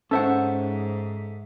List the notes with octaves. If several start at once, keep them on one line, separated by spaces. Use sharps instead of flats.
G#2 C#4 A4 C5 E5 F#5